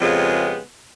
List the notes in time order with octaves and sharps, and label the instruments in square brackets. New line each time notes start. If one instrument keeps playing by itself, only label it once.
[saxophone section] F2 C#3 G#3 B3 G4